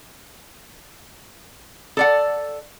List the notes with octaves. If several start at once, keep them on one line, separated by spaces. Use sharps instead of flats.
A4 D5 F#5